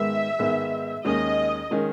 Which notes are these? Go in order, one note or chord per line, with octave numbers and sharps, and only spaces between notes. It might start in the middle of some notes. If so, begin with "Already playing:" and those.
Already playing: G#2 D#3 G#3 B3 E5
G#2 D#3 G#3 B3
D#2 D#3 G#3 C#4 D#5
D#3 G#3 C#4